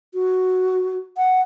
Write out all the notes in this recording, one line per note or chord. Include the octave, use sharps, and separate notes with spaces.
F#4
F#5